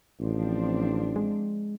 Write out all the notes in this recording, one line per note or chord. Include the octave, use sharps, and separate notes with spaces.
A1 F3 C4 D4
G#3